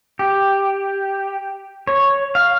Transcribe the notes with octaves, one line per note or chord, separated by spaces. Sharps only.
G4
C#5
F5